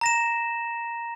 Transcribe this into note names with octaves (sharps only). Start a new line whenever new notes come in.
A#5 A#6 E7